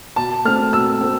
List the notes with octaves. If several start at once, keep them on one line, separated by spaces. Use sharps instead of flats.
B2 A5
A3 C4 F6
B2 E6
A3 C4